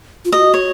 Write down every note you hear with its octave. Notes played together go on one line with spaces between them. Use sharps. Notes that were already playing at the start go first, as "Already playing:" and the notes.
F4
F#4 D#5
C#5